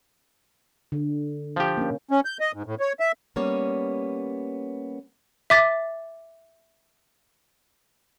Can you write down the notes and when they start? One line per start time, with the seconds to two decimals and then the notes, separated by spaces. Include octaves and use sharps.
0.92 D3
1.56 F3 G4
1.77 A#3 C#4
2.11 C#4
2.25 G6
2.40 D#5
2.54 G#2
2.66 A2
2.80 C#5
3.00 E5
3.36 G3 A#3 B3 C#4 C#5
5.50 E5 D6 A6